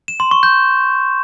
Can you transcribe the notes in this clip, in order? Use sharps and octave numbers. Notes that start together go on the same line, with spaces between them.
E7
C6
C#6
G6